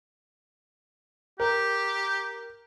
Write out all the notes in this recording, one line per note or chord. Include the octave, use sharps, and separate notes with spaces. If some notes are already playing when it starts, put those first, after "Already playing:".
G4 A#4 G5